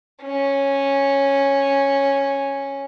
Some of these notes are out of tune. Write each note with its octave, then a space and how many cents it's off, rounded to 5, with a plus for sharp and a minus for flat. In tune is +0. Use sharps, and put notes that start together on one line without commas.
C#4 -5